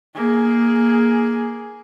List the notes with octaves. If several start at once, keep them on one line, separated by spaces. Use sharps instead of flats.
A#3 G#4